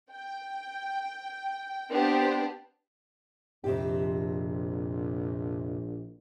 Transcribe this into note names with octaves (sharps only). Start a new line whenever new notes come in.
G5
B3 C4 D4 G4 C5
A#1 F2 C3 G4